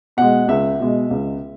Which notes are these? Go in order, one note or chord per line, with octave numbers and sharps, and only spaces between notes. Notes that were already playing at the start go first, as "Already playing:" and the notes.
B2 G#3 F#5
C#2 E5
B2 G#3
C#2